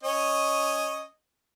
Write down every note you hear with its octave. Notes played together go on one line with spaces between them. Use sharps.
C#4 C#5 D#5